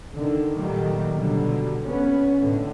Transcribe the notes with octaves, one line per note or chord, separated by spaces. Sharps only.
D3 D#3
A#2 D#3 F#3 G3 A3
B2 D3 F#3 G3
B3 C#4
A2 D3